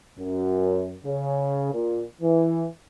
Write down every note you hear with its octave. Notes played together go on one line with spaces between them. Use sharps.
F#2
C#3
A#2
E3